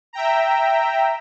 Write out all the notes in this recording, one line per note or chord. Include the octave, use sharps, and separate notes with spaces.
E5 G5 A#5